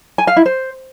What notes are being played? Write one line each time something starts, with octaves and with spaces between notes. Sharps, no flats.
G#5
F5
E4
C5